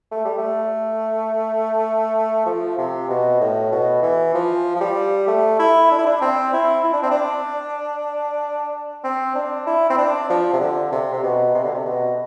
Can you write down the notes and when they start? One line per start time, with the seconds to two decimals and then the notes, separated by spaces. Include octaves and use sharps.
0.12 A3
0.25 G3
0.38 A3
2.46 F3
2.78 C3
3.09 B2
3.41 A2
3.72 B2
4.02 E3
4.34 F3
4.75 F3
4.81 G3
5.27 A3
5.59 E4
5.91 D4
5.98 E4
6.06 D4
6.21 C4
6.53 E4
6.84 E4
6.93 D4
7.03 C4
7.11 D4
9.04 C4
9.35 D4
9.67 E4
9.90 C4
9.98 D4
10.30 F3
10.53 C3
10.60 D3
10.92 C3
11.13 C3
11.23 B2
11.54 C3
11.64 D3
11.74 C3
11.85 B2